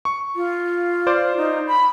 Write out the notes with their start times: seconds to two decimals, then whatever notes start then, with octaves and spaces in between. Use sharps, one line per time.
0.05 C#6
0.36 F4
1.07 C5 D5 D6
1.37 D#4
1.67 B5